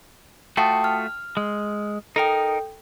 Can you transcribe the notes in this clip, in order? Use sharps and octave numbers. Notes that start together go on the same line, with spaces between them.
A3 F4 F#4 G5 A5 D#6
F6
G#3
D#4 A4 A#4 G5